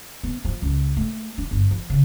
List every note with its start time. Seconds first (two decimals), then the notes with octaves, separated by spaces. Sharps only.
0.23 B3
0.45 F3
0.62 C#2
0.97 A3
1.38 D4
1.51 G1
1.71 F3
1.90 C#3